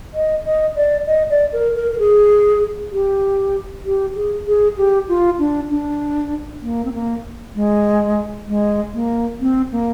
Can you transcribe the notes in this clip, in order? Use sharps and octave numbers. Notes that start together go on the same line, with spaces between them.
D#5
D#5
D5
D#5
D5
A#4
A#4
A#4
G#4
G4
G4
G#4
G#4
G4
F4
D4
D4
A#3
C4
A#3
G#3
G#3
A#3
C4
A#3